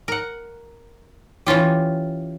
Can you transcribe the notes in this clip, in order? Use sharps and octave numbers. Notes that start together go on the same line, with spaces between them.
A#4 F#5
E3 C#4 F4 G4